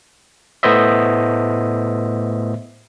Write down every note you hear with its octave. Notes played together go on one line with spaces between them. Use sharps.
A2 A3 B3 C5 D#5 E5